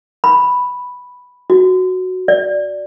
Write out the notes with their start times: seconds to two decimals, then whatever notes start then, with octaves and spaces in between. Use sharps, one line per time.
0.24 B5
1.50 F#4
2.28 D5